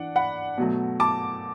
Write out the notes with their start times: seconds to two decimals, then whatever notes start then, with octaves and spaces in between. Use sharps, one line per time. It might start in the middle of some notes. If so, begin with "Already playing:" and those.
Already playing: E3 D4 D5 F#5
0.16 F#5 B5
0.58 B2 F#3 A3
1.00 A5 D6